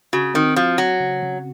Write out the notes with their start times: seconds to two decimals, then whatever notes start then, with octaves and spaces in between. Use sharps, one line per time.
0.13 C#3 F#4
0.34 D#3 C4
0.56 F3 F#4
0.78 F#3 F#4
1.00 C#3
1.22 C#3